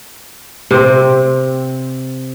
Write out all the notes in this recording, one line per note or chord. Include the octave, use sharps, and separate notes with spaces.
C3 C4